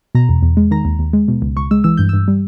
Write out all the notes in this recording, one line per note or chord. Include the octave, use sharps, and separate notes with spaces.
B2 A#5
E2
E2
G#3
D#3 A#5
D#2
D#2
G#3
B2
C#2
C#2 C#6
G#3 E6
E3 E6
G2 G6
G2 E6
G3